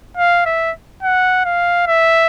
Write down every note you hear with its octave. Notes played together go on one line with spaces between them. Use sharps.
F5
E5
F#5
F5
E5